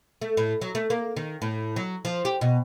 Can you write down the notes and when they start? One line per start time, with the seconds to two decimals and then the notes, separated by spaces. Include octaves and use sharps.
0.21 A3
0.37 A2
0.61 F#3
0.75 A3
0.90 A#3
1.16 D#3
1.42 A2
1.76 F#3
2.05 F3
2.25 G4
2.41 B2